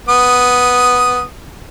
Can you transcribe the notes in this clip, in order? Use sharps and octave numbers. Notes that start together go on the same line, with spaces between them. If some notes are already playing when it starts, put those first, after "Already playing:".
B3 D#6